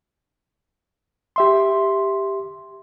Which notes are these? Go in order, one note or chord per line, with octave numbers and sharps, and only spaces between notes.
G4 E5 C6